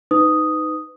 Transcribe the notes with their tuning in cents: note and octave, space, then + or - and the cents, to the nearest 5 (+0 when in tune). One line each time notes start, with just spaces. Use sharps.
D#4 +0 B4 +30 D#6 +0